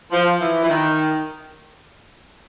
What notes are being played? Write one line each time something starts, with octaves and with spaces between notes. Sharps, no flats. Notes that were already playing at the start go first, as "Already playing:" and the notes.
F3
E3
E3
D#3